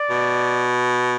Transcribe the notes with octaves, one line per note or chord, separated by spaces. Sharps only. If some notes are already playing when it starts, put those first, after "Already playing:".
Already playing: D5
B2